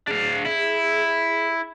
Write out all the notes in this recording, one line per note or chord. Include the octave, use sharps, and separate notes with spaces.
D4 G#4 F5
E4